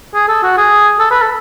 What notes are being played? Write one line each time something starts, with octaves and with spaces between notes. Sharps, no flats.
G#4
A4
F#4
G#4
A4
B4
A4